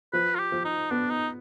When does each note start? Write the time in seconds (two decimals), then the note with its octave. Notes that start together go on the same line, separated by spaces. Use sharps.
0.13 F3 B4
0.35 F4
0.39 G4
0.52 F3
0.65 D#4
0.90 B3 D4
1.10 D#4